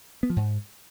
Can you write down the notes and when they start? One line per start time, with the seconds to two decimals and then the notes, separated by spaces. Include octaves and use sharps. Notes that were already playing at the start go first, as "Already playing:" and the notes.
0.23 B3
0.30 F3
0.36 G#2